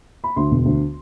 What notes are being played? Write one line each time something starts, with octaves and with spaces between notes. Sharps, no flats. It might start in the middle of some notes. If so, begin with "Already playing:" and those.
B5
D2 C6
E1
D2